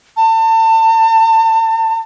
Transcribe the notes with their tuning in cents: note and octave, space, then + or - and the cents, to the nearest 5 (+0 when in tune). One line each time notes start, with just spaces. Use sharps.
A5 +35